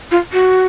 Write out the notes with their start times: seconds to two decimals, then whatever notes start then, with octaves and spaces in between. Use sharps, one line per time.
0.11 F4
0.33 F#4